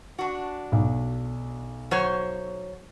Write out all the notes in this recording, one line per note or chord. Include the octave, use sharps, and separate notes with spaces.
D4 F#4
B1
F#3 C5 C#5